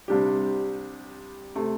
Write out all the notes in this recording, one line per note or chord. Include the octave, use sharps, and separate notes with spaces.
C2 C3 G3 D4 G4
C3 A3